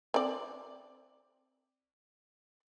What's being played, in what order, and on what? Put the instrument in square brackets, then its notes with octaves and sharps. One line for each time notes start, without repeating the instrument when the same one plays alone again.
[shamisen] C4 D5